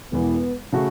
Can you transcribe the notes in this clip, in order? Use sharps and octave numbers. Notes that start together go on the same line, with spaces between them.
E1 E2 E3 B3
C#3 A3 F#4